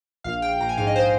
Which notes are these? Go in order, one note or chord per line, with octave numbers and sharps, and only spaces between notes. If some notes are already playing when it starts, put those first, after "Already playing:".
A#1 F5
A#1 G5
A#1 A#5
G#5
G#2 F5
D#5
C5